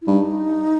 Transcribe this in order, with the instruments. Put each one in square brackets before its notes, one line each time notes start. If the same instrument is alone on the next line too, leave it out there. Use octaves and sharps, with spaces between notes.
[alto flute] E4
[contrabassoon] G2 [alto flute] D#4